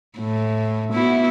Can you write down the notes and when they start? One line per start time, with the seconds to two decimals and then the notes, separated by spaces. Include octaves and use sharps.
0.19 A2
0.93 B3 E4 F#4